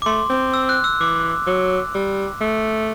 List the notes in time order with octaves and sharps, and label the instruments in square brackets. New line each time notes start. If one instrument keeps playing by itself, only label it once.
[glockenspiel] D6
[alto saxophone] A3 [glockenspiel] C6
[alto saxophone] C4
[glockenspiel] E6
F#6
E6
[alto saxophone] E3 [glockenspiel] D6
[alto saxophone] F#3
G3
A3